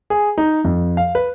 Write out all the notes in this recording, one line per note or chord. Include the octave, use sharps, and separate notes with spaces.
G#4
D#4
F2
F5
B4